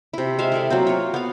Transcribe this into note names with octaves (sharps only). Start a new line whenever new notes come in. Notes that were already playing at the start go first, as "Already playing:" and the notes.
C3 E4
G#3 C5 E5 F5
E4 A4 D5
F#3 A#3 C4
F4 C#5
B3 F5